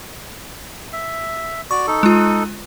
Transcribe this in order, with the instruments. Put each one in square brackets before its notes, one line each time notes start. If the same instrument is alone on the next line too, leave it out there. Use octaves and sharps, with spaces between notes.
[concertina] E5
[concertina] F#4 D5 [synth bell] C#6
[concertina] D#4 A4
[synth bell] G#3 F4